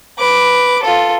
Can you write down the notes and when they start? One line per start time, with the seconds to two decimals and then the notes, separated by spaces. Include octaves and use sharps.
0.18 B4 D6
0.83 F4 A4